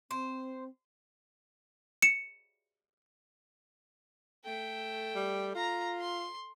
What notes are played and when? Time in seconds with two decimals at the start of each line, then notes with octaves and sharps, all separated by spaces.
0.11 C4 C5
2.02 C#7 E7
4.45 A3 G5
5.15 G3
5.55 F4 A#5
6.00 C6